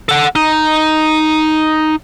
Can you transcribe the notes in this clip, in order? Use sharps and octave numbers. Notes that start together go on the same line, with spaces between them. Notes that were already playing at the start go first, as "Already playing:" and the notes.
A4 F#5
D#4